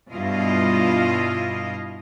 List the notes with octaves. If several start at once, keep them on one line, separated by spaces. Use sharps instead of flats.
G2 B2 E4 F4 D#5 F5